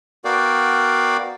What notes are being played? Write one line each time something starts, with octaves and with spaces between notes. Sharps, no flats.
B3 F#4 A#4 D5 F5 G5